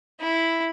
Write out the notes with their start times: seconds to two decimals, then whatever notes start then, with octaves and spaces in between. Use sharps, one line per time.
0.20 E4